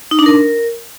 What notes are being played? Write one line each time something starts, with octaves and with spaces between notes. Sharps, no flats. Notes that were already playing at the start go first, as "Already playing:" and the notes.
D#4
D4
A#4